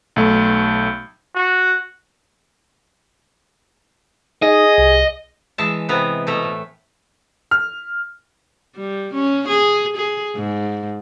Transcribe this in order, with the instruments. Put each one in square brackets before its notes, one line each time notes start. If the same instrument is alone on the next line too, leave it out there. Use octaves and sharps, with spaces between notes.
[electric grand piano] B1 A3
[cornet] F#4
[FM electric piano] D#4 [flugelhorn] G#4 [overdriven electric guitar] D#5
[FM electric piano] C2
[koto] E3 G#3 E5 A5
C3 E3 B3 B4 A#5
B2 A3 E5 A#5
A2
[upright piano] F6
[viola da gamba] G3
C#4
G#4
G#4
G#2